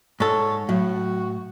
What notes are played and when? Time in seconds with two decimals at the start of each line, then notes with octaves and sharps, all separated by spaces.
0.20 G#2 A4 C#5
0.69 A2 F#3 F#4